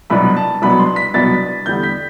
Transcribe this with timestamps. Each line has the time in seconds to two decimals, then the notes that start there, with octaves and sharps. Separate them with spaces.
0.10 C2 B2 F#3 B3 D4 B5
0.36 A5
0.62 C2 B2 F#3 B3 D4 B5
0.79 C6
0.96 B6
1.14 C2 B2 F#3 B3 D4 A6
1.66 E2 D3 G3 B3 G6
1.83 B6